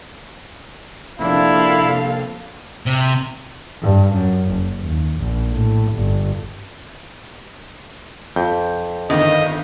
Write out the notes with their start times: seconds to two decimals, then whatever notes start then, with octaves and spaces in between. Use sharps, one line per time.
1.20 C3 F3 A#3 C4 D4 E4 A4 F5
2.86 C3
3.82 G2
4.15 F#2
4.51 F#1
4.83 D#2
5.19 A#1
5.51 A2
5.93 G1
8.36 F2 G6
9.10 G1 D#3 D#5